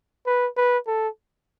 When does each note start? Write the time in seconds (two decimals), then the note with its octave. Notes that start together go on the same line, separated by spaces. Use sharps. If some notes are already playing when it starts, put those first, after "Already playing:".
0.26 B4
0.57 B4
0.87 A4